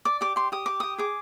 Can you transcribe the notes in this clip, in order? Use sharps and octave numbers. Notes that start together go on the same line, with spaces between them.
D5 D6
G4 D6
G4 C6
G4 D#6
G4 D6
G4 D#6
G#4 D6